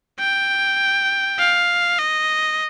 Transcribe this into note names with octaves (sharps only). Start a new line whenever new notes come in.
G5
F5
D#5